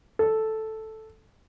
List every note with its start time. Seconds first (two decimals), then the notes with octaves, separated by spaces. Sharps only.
0.19 A4